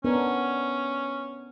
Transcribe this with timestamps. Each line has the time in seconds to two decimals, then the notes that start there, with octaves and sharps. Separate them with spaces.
0.04 B3 C#4 D4 A#4